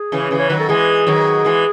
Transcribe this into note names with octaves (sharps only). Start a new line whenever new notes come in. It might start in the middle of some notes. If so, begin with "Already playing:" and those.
Already playing: G#4
C#3 E3
C#3 E3
C#5
D#3 F#3 B4
A4
E3 G#3 G#4
D#3 F#3
E3 G#3